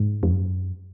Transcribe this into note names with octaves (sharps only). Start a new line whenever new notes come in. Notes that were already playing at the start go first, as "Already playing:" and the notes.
Already playing: G#2
F2
F#2